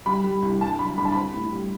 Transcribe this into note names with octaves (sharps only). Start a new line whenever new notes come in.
G3 B5
G3
C2
G2 A5
F#3 B5
G2 B5
A5
C4 B5
A2
G3